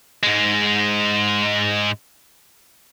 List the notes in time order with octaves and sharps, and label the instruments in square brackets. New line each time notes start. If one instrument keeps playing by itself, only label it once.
[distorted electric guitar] G#2 G#3